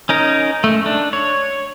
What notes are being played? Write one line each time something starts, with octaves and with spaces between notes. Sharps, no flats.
C#4 D#4 A#4
A3
D4
C#5